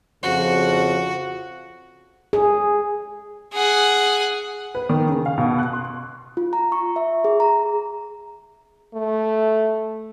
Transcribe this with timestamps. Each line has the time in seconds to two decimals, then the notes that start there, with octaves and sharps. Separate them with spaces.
0.23 F2 C#3 F3 F#4
2.33 G#4
3.53 G#4 F#5
4.75 B4
4.89 D#3
5.09 C#3
5.26 F5
5.38 B2
5.58 F#6
5.73 C6
6.37 F4
6.53 A#5
6.72 C#6
6.96 E5
7.25 G#4
7.40 A#5
8.94 A3